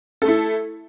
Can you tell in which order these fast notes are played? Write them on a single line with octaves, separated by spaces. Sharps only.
A4 A3 E4